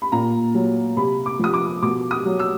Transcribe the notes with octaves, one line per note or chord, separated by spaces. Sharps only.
B5
A#2 A#5
F#3
C3 B5
D6
F3 D#6
D6
B2 D6
D#6
F#3
E6